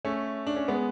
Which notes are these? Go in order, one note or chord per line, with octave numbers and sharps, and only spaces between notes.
A3 C#4
D4
C#4
G#3 B3